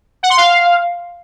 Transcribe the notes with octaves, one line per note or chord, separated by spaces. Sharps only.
F#5
C6
F5